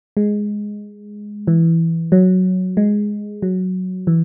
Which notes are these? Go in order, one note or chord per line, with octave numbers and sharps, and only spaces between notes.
G#3
E3
F#3
G#3
F#3
E3